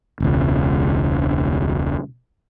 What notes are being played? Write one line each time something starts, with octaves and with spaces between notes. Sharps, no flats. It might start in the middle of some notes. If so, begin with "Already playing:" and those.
E1 C#2